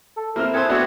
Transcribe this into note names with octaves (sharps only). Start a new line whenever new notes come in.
A4
A#3 C4 E4 A#4 F6
C4 G#4 A4 B4 C5 G#6
A3 B3 D4 F#4